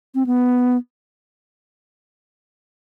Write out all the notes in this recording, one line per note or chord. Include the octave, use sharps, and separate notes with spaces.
C4
B3